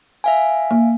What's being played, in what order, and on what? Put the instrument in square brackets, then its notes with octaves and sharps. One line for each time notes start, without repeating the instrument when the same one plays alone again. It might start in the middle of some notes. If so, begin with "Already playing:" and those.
[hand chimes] E5 F5 G#5
[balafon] A#3